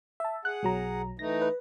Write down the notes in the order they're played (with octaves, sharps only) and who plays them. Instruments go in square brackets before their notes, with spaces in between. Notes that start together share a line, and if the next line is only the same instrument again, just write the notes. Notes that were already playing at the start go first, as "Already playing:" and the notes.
[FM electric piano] E5 A5
[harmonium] G#4 F#5 [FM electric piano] F#6
[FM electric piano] B1 F#3 A#5
[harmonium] E3 A3 D#4 [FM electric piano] A#6
[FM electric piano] B4